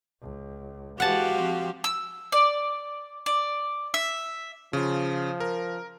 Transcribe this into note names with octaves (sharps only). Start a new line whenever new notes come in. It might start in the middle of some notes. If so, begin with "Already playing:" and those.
C#2
E3 G#3 F#4 G4 F5 F#5 A5
F3 C4
E6
D5
D5
E5
C#3 F3 F4
A#4